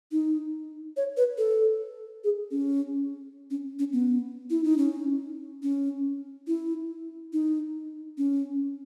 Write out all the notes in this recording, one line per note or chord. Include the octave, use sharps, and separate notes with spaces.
D#4
C#5
B4
A4
G#4
C#4
C#4
C#4
B3
E4
D#4
C#4
C#4
E4
D#4
C#4